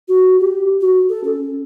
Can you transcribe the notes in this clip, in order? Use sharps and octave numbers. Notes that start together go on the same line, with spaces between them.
F#4
G4
F#4
A4
C#4